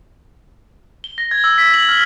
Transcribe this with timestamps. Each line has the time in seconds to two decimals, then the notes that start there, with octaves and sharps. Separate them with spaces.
1.04 G7
1.18 A#6
1.31 G#6
1.44 E6
1.58 B6
1.74 F#7
1.89 F6